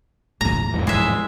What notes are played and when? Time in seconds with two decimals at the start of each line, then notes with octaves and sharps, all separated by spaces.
0.41 E2 A2 A#5
0.74 F2 G#2 E3
0.87 A2 G#3 E5